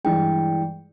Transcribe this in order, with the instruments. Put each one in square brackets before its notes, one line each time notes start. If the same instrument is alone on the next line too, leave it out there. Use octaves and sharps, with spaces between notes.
[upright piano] G2 E3 G#3 [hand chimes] G5